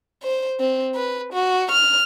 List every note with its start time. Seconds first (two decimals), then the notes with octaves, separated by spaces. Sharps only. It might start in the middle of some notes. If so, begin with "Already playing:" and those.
0.23 C5
0.60 C4
0.95 B4
1.33 F#4
1.71 F6